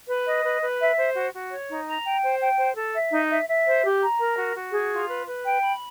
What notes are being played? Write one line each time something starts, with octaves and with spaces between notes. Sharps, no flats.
B4
D#5
B4
B4
E5
C5
F#4
F#4
C#5
D#4
A#5
G5
C5
G5
C5
A4
E5
D#4
E5
E5
C5
G4
A#5
A#4
F#4
F#4
G#4
F4
B4
B4
G5
B5